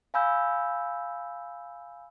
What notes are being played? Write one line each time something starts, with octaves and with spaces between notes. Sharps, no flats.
F5 G#5 B5 E6 G6